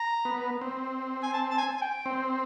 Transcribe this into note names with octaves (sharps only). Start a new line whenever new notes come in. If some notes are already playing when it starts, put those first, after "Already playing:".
Already playing: A#5
B3
C4
G#5
A5
A5
G#5
G#5
G5
C4